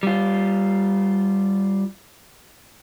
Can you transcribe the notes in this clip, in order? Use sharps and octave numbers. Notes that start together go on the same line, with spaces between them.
G3 F4